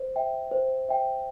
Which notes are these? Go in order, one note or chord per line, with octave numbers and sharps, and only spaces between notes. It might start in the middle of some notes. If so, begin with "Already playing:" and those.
Already playing: C5
E5 G5
C5
E5 G5